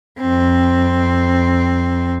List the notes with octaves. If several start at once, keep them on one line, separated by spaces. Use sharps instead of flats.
F2 C4